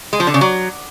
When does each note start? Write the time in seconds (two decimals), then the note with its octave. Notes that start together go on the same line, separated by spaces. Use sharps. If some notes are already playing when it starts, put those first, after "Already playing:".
0.13 G#3
0.20 F3
0.27 D3
0.34 C#3
0.41 F#3